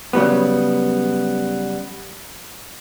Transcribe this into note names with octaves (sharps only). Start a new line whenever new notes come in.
C#3 F#3 G3 B3